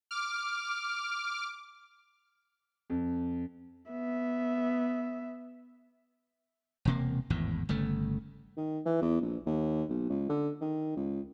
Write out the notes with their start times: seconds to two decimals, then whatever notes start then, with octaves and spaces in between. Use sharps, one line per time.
0.11 D6 F6
2.90 F2
3.92 B3 E5
6.85 E1 C3 A#3
7.30 G#1 E2 A2
7.69 G1 C#3 A3
8.57 D#3
8.86 E3
9.02 E2
9.22 A#1
9.46 D#2
9.89 B1
10.09 C#2
10.30 D3
10.61 D#3
10.96 C#2